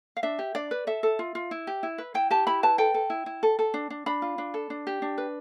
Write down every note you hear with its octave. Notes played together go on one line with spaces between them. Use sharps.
F5
D4 E5
G4
D4 D5
B4
A4 E5
A4
F4
F4
E4
G4
E4
B4
E4 G5
G4 A5
E4 B5
B4 A5
A4 G5
A4
E4
E4
A4
A4
D4
D4
D4 B5
F4
D4
A4
D4
G4
D4
B4